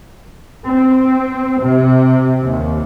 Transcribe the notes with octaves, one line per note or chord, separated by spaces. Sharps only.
C4
C3
D#2